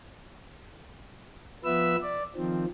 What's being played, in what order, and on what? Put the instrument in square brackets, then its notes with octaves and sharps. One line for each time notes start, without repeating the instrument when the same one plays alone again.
[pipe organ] F3 B3 B4 E5 E6
D5
D#3 F3 C4